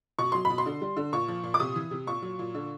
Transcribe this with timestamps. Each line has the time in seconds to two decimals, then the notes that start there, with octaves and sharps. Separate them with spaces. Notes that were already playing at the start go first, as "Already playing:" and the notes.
0.19 B2 C#6
0.32 F#3 C6
0.45 B5
0.50 B2
0.58 C6
0.66 D3
0.81 G3
0.97 D3
1.13 A#2 C#6
1.28 F3
1.44 A#2
1.54 D6
1.60 C3 D#6
1.76 E3
1.91 C3
2.07 A#2 C#6
2.22 F#3
2.39 A#2
2.55 D3